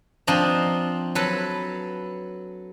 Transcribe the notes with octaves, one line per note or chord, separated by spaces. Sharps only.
F3 C4 D4 D#5 A#5
F#3 A4 B4